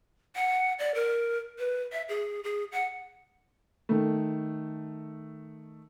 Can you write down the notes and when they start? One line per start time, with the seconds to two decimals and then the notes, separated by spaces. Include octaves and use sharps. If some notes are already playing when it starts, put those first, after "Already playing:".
0.36 F#5
0.79 D5
0.95 A#4
1.59 B4
1.92 E5
2.09 G#4
2.44 G#4
2.72 F#5
3.89 D#3 A3